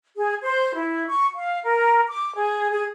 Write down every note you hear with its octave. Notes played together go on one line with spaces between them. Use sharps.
G#4
C5
E4
C#6
F5
A#4
D6
G#4
G#4